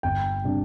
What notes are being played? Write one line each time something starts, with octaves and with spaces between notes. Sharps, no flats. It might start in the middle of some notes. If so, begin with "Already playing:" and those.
G1 G5
C3 G3 D4